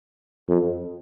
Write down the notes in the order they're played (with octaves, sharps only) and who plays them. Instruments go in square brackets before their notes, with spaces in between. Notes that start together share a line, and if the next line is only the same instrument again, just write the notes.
[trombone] F2